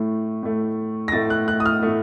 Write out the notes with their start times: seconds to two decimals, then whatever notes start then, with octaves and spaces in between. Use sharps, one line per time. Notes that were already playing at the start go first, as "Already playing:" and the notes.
Already playing: A2 A3
0.43 A2 A3
1.08 A#6
1.12 A2 A3 A6
1.30 F#6
1.48 F#6
1.60 D#6
1.66 F6
1.82 A2 A3